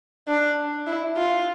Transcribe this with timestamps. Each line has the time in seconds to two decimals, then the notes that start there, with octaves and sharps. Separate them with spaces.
0.28 D4
0.87 E4
1.17 F4